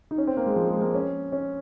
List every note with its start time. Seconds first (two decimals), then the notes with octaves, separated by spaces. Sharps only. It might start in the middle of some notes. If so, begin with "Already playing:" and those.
0.11 D#4
0.18 C#4
0.27 C4
0.37 A#3
0.46 G#3
0.56 F3
0.69 G#3
0.82 A#3
0.94 C#4
1.32 C#4